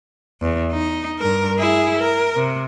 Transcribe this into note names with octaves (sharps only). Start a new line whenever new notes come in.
E2
D#4
G2 A#4
E4 G#4
A#4
C3